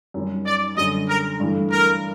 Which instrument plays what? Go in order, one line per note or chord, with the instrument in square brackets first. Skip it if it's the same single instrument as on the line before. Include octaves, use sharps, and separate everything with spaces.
[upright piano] F#2 D#3 G3
[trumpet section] D5
[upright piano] F#2 D3 G3 [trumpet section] D#5
[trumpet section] A#4
[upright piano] G2 E3 A3
[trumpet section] A#4